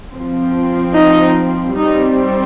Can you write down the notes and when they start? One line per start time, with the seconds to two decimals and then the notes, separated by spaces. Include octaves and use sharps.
0.12 F3 C4
0.94 D#4
1.76 G3 C4 D#4